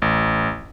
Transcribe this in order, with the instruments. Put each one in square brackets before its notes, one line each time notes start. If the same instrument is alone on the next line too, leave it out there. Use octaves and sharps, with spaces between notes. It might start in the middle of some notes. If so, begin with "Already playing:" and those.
[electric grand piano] A1